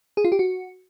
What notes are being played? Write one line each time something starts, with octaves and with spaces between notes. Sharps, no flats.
G#4
F4
G4
F#4